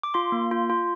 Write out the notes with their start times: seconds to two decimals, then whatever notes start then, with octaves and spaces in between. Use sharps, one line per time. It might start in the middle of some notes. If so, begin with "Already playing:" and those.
0.03 D6
0.14 F4 C6
0.32 A#3
0.51 F4
0.70 F4